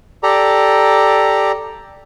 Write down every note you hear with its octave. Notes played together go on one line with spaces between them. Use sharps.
G4 A4 D5 A#5